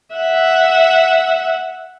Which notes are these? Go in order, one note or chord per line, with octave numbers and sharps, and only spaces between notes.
E5 F#5